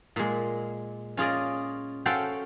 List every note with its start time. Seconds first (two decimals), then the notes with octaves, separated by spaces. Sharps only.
0.16 A#2 G#3
1.17 C#4 F4 G#4 D5 D#5
2.06 C#4 F#4 A4 C5 F5 G5